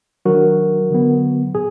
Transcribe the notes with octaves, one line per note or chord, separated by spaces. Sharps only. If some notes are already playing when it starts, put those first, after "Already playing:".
D#3 F#3 D4 F#4 A#4
D3 F#3 B3
A#2 G#4